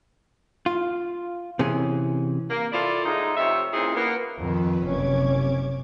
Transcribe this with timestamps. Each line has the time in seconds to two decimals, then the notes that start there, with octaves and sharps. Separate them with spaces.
0.66 F4
1.59 C3 E3 C#4 G#4
2.50 A#3
2.72 E4 F4 A4 D5
3.05 G#2 G#3 A3 D#4
3.37 F2 C3 C#5 E5
3.74 A#2 C#3 C4 D#4 E4 G#4
3.95 A#3 B3 F4
4.38 F2 D#3 F3 B4
4.83 F#1 C3 C#4 D6 G#6